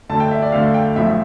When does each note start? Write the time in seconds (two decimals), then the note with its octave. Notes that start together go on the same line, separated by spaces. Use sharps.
0.09 D2 D3 A3 A5
0.20 G5
0.31 E5
0.42 D5
0.52 D2 D3 A3 F5
0.74 G5
0.96 B1 A2 F3 E5